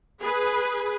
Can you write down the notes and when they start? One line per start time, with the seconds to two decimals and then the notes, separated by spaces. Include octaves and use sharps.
0.22 G#4 B4